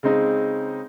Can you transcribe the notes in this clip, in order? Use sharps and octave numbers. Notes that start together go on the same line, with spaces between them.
C#3 G#3 C4 D#4